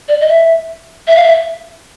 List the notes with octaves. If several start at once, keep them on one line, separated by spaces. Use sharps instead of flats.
D5
D#5
E5
E5
F5
E5